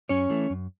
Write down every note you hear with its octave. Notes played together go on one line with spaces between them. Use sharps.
F#2 C#4 C#5
E3 A3
F#2